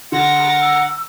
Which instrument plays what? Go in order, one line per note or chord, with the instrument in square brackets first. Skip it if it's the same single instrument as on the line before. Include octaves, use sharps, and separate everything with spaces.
[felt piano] D3 [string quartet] A#4 A6 A#6 [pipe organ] F#5 [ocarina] C6
[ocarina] E6